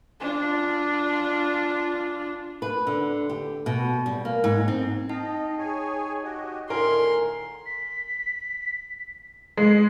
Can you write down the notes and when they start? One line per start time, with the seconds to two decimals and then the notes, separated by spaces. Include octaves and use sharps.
0.20 D4 F4
2.62 B4
2.87 D3
3.29 G4
3.66 B2
4.06 G3
4.25 A#3
4.44 G#2
4.68 C4
5.09 D#4 D#5 G5 A5
5.59 G#4 C#5 G#5
6.24 F#4 G4 D#5
6.70 A2 D3 D#3 A#4 G#5 C6
7.66 B6
9.57 G#3 C7